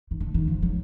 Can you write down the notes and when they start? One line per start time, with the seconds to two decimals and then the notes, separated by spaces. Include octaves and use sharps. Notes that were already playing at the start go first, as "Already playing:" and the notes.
0.11 D#3
0.20 D3
0.34 D#3
0.48 F3
0.62 F#3